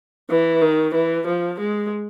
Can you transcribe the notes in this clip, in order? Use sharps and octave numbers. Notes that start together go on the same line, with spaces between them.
E3
D#3
E3
F3
G#3